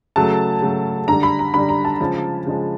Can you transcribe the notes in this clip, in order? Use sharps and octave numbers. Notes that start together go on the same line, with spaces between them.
C#3 F#3 A3 A5
C#3 F#3 A3
D3 G3 A#5
B5
A#5
D3 G3 B5
A#5
A5
C#3 F3 G#3
C#3 F3 G#3